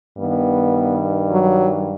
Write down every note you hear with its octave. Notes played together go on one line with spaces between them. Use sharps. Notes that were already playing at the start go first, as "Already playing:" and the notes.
G2 D#3 B3
F#3